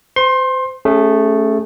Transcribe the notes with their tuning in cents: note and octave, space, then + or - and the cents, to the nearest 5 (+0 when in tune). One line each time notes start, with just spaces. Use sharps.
C5 -30 C6 +25
A3 +0 C#4 +0 G#4 -30